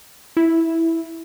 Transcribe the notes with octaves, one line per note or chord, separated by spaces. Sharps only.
E4